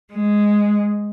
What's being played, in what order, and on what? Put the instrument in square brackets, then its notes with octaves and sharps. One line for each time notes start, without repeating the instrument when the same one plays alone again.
[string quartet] G#3